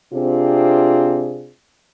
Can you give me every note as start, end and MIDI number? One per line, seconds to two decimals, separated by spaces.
0.12 1.50 48
0.12 1.50 60
0.12 1.50 62
0.12 1.50 65
0.12 1.50 68